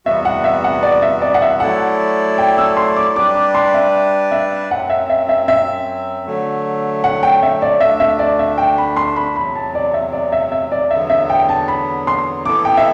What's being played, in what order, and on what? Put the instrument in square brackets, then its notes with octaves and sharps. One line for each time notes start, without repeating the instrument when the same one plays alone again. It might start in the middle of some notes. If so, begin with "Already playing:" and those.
[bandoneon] E2 C3 G3 B3 F#4 [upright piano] E5
[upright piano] F#5
E5
F#5
D5
E5
D5
F#5
E5
[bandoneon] F#3 A3 E4 A4 D5 [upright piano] F#5
[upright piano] G5
E6
C6
D6
[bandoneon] G3 D4 G4 B4 D5 [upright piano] D6
[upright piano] D6
C6
E5
E5
[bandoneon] F#2 F#3 C4 [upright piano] F#5
[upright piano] E5
E5
E5
E5
[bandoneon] D3 F#3 A3
[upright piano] F#5
G5
E5
D5
[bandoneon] D2 D3 A3 D4 [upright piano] E5
[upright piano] E5
D5
E5
G5
B5
C6
B5
[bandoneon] E2 C3 F#3 [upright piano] B5
[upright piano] A5
D5
E5
D5
E5
E5
D5
[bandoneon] E2 D3 F#3 B3 [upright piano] E5
[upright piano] E5
G5
A5
B5
C6
[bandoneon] E3 B3 E4 A4 [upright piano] D6
[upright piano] G5
E5